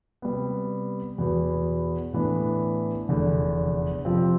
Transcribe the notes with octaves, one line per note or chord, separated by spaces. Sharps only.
C3 G3 B3
E2 B2 B3
A2 E3 B3 D4
F1 E2 D3
F2 C3 F3 C4